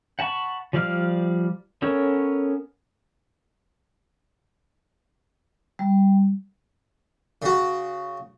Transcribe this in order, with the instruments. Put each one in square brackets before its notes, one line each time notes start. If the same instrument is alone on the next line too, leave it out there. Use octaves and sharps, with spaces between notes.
[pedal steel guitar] F#5 A5 B5 C#6
F3 G3 D5 F5 F6
B3 C#4 A4 A#4 C#5
[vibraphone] G3
[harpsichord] C#3 F#4